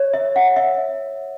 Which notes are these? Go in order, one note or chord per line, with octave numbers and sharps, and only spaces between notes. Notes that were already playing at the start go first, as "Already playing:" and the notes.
Already playing: C#5
E5
F#5
E5